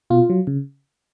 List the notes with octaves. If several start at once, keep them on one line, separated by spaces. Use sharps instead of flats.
B2 F4
F#3
C#3